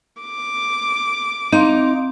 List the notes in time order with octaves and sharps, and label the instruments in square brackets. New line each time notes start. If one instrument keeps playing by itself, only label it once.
[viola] D6
[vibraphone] C4 F5 C6 [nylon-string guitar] D#4